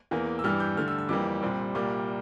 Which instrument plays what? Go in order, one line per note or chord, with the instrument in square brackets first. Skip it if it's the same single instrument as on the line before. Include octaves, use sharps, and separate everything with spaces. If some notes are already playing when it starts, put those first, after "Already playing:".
[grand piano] E2 E3 A#3
E6
G2 E3 G3 F6
G6
G2 D3 A3 F6
E6
E6
F2 E3 G3 A#3 D6
C2 A#2 G3 C4
C2 A#2 G3 A#3 D6